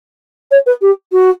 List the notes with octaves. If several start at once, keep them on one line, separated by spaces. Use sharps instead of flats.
C#5
B4
G4
F#4